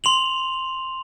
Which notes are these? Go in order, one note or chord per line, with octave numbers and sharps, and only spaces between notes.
C6 F7 F#7